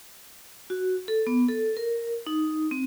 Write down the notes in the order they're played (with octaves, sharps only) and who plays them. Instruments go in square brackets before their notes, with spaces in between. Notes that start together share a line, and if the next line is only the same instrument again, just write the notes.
[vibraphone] F#4
A4
B3
A4
A#4
D#4
C4